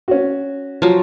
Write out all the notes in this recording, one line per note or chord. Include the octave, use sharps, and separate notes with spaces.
C#4 F#4
F3 F#3